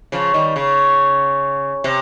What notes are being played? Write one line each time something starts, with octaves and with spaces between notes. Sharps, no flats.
C#3 F3
D#3 G3
C#3
C3